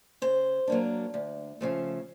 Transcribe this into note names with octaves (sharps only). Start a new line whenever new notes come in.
C#3 C5
F#3 A#3 D4
D2
C#3 F3 A3